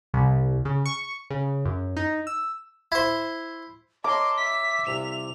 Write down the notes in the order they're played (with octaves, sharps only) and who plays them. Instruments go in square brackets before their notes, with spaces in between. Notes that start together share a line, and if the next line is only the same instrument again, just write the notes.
[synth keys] C2
C#3
C#6
C#3
F#2
D#4
E6
[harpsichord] E4 C5
[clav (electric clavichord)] A#4 C#5 [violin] D#5 C6 [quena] A5 [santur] D6
[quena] E5 [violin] B6
[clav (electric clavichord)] C2 C3 F4 [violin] F7